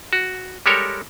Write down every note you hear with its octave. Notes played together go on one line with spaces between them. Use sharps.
F#4
G3 G#3 G4 A4 A#4 C#5